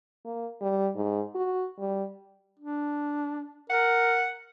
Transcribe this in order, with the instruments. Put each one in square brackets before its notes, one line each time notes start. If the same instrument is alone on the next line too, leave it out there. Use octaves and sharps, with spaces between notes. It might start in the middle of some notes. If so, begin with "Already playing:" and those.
[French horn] A#3
G3
G#2
F#4
G3
[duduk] D4
[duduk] A#4 [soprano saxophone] F#5